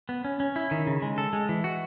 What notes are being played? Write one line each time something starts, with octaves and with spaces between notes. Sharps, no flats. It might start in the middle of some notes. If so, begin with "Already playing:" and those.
B3
C#4
C#4
E4
D#3
C#3
G#3
A4
G#3
E3
F#4